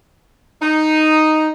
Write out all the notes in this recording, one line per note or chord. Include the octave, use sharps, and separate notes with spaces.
D#4